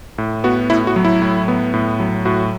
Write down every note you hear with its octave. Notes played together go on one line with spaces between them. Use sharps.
A2
B3 F#4
A2 E4
F#4
F#3
E4
A2
B3
A2
F#3
A2 F#4